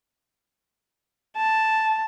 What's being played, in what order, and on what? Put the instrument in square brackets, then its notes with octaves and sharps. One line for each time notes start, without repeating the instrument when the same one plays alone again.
[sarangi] A5